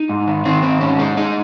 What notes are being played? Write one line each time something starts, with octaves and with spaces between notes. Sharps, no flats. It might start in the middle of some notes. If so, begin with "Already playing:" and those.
Already playing: D#4
G#2
D#3
D#3 C4
G#2 C4
G#2 C#4
G#3 D#4
G#3 D#4